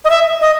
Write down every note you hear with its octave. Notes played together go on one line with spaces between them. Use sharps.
D#5
E5
D#5